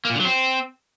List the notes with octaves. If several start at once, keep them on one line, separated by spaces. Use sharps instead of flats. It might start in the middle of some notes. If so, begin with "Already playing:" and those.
A#3
A#2
D3
F#3
C4